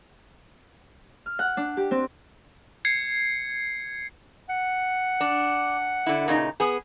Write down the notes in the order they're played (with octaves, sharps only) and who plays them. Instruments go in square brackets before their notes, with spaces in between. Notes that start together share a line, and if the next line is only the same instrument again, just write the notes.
[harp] F6
F#5
D4
G4
C4
[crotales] G#6 C7 C#7
[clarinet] F#5
[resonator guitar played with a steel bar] D4
D3 E4
A#2 C#3 D#4
B3 G#4